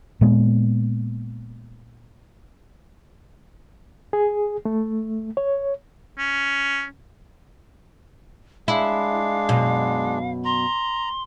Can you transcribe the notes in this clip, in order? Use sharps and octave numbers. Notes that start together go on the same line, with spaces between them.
A#2 G#3 B3
G#4
A3
C#5
C#4
G#3 D4 E4 F5
F#2 B2
A#5 C6